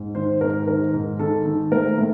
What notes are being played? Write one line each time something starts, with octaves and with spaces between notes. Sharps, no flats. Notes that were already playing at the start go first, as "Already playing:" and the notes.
Already playing: G#2
D#3 C5
G#2 A#4
D#3 A#4
G#2
D#3 A4
D#3
A2 A#4
A2